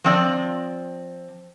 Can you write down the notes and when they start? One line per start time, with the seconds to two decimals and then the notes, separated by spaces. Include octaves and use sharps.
0.04 F3 C4 D5